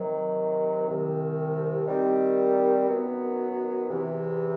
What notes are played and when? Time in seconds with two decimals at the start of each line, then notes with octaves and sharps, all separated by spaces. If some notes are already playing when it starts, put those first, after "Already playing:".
Already playing: C3 D#3 F#3
0.87 C2 C3 D#3
1.87 D#3 G3 C4
2.88 F#2 D#3 F#3 B3
3.88 E2 C3 E3